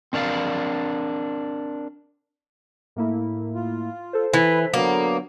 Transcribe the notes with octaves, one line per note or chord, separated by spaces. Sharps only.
C4 D4 A#4 C#5 D5 F5
A2 A#3 E4
F4
A4 C5
E3 E4 B4
D3 F#3 A#3 B3